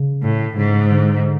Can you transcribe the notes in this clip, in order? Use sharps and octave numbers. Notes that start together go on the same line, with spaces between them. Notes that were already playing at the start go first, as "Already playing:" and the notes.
Already playing: C#3
A2
G#2 C#3
D3